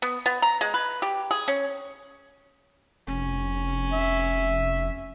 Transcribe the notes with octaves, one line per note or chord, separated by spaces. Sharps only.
B3
B3
A#5
G#3
B4
G4
G#4
C#4
F1 C#4
E5